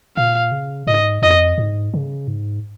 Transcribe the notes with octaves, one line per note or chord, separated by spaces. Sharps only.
A#2 F5
C#3
G#2 D#5
F2 D#5
G#2
C#3
G#2